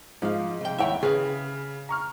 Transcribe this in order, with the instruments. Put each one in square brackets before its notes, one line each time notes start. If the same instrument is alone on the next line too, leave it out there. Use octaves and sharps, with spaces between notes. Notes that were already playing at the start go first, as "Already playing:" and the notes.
[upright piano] G#2 [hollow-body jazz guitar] F3 F5
[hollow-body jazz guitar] C2 G5
[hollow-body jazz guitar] D#2 C#5 E5 [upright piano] E4 F#5 G5
[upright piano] C#3 [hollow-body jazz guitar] G#4 B4
[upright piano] A#5 C#6 F6